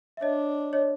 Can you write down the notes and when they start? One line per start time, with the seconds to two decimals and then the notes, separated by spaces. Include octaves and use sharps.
0.17 E5
0.21 D4 C#5 D#5
0.73 C#5 D#5